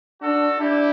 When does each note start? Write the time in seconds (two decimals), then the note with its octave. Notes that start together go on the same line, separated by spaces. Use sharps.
0.21 D4 F#4 A4
0.59 D4 E4 G4